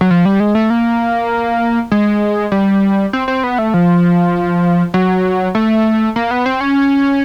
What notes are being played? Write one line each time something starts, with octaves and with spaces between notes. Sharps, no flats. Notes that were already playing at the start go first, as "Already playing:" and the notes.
F#3
F3
G3
G#3
A3
A#3
G#3
G3
C4
C4
B3
A3
F3
F#3
A3
A#3
B3
C4
C#4